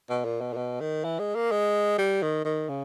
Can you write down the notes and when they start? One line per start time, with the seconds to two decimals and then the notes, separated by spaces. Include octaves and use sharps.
0.09 B2
0.25 A#2
0.41 B2
0.53 A#2
0.57 B2
0.81 D#3
1.04 E3
1.19 G#3
1.35 A#3
1.51 G#3
1.98 G3
2.22 D#3
2.45 D#3
2.69 C#3